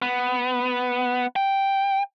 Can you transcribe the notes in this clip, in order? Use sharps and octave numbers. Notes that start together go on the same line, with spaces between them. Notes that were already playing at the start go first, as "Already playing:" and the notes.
B3
G5